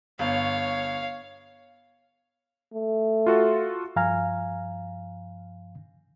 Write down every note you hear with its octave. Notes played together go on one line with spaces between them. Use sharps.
G1 C#5 F5
A3
F4 F#4 A4
G2 F3 F5 G#5 A#5 F6